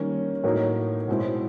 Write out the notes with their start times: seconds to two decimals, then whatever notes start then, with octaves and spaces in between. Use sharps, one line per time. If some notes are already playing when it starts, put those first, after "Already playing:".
Already playing: D#3 G3 A#3 C#4
0.44 A2 F#3 A#3 D#4
1.08 B2 G#3 C4 E4